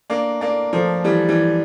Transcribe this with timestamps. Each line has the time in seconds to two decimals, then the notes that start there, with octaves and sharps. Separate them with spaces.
0.10 A#3 D4
0.41 A#3 D4
0.73 F3 A3
1.04 E3 G3
1.29 E3 G3